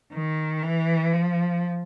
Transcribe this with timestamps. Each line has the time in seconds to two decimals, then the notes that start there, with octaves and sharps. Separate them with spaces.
0.13 D#3
0.63 E3
1.13 F3